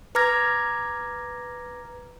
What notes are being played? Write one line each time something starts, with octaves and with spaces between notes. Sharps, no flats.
B4 A#5 D6 F6 G#6 A#6